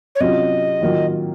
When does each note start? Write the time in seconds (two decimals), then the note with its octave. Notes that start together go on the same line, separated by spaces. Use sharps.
0.15 C#5
0.20 C3 F#3 C#4 F4 D#5
0.81 D#3 F#3 A#3 F4